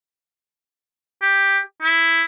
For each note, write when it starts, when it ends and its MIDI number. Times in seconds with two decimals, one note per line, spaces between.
1.22 1.59 67
1.82 2.24 64